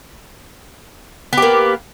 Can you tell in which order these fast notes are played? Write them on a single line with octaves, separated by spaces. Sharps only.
B3 G4 A#3